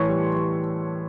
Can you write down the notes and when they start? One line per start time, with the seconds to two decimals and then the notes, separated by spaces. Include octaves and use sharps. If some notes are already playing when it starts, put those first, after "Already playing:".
Already playing: A2 E3 C#5 C6 C#6
0.09 G3
0.35 G3